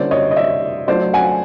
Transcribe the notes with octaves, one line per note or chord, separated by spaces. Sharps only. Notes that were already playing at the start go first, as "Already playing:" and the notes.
Already playing: D3 G3 A#3 C#4 E4 C5 D5
C#5 D#5
D#5
D5 E5
F#3 A3 D4 F4 C5 D5
F#5 G#5